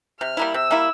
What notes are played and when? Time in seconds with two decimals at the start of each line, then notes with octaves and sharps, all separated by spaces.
0.20 C3 F6
0.37 G3 A#3 E4
0.53 C3 E6
0.71 G3 A#3 E4